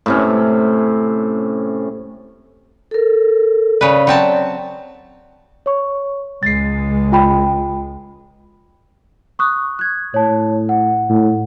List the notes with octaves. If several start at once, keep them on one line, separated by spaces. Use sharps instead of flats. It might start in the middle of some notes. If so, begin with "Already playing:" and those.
A2 C3 C#4
A4 A#4
C#3 B4 D5
F#3 C4 A5
C#5 C#6
C#2 G#3 A6 C7
F4 G5 B5
C#6 D#6 F#6
F#6 G#6
A2 C#5 A5
F#5
A2